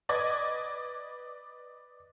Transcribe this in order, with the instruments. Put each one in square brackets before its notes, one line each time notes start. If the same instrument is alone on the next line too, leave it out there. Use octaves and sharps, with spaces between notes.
[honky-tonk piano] B4 D5 D#5 D6 G#6